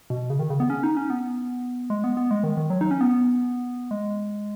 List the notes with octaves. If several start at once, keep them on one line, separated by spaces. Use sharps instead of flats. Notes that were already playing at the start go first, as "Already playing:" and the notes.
B2
C#3
D#3
C#3
B3
C#4
D#4
C#4
B3
G#3
B3
B3
G#3
D#3
D#3
F#3
D#4
C#4
B3
G#3